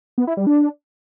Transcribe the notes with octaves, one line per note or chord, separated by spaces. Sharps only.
B3
E4
G3
D4